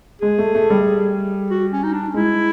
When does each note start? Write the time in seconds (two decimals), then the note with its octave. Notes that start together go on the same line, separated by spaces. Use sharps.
0.22 G#3 G#4
0.38 A3
0.55 A3
0.70 G3
1.51 F#4
1.72 C#4
1.84 D#4
1.93 D4
2.14 G#3 E4